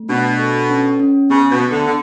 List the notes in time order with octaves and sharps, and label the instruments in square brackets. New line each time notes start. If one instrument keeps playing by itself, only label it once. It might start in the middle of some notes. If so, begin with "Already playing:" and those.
Already playing: [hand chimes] A3
[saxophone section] B2 [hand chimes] D4
[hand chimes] A4
C#4
C#4
[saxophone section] C#3 [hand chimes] B3
[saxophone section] B2
[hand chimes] B3
[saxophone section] D2 D3
D3